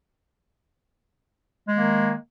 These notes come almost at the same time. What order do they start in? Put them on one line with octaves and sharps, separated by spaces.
G#3 D#3 A#3